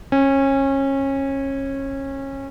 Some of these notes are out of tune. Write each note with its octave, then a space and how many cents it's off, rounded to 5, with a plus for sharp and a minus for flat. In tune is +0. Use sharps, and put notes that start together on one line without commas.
C#4 -25